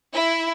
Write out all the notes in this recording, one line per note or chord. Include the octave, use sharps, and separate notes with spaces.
E4